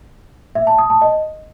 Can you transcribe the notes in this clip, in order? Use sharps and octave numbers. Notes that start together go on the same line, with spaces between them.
E5
A5
D#6
A5
D#5